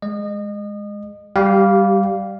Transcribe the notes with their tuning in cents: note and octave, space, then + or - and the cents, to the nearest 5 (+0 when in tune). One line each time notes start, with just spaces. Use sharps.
G#3 +0 D#5 -30
G3 +0 G4 -25 F5 +0